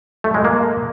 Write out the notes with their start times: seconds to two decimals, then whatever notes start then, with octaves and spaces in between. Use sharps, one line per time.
0.24 A3
0.34 G#3
0.45 A#3